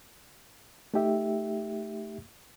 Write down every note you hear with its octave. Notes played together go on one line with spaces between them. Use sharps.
A3 D#4 G4 E5